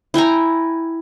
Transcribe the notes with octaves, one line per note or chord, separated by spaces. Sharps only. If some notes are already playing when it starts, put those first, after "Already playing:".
E4 G5 G#5 A#5